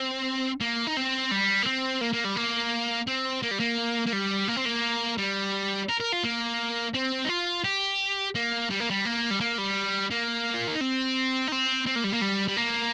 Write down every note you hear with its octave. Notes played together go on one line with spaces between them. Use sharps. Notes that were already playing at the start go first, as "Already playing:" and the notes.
Already playing: C4
A#3
D#4
C4
G3
A#3
C4
A#3
A#3
G3
A#3
C4
A#3
G3
A#3
A#3
G3
A#3
C4
A#3
G3
A#4
A#4
F4
A#3
C4
D#4
F4
G4
A#3
G3
A#3
G3
A#3
G3
A#3
G3
A#3
F4
D#4
C4
D#4
C4
C4
A#3
G3
A#3
G3
G3
A#3